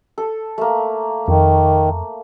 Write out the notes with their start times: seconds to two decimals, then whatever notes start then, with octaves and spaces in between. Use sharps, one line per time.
0.18 A4
0.58 A3 A#3
1.28 F2 D#3